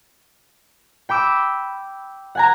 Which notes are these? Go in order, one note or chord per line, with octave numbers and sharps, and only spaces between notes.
G5 B5 D6 E6
F#5 G#5 A#5